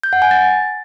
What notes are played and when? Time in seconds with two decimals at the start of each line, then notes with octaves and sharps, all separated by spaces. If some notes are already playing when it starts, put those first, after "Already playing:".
0.03 G6
0.13 F#5
0.22 G#5
0.31 A6